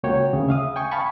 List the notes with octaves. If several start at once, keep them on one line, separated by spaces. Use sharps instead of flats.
C#2 A#3 F#4 C#5 G5
D2 C#3
E5 F5 D#6
G5 G#5 C#6
F5 G#5 A5 B5 C#6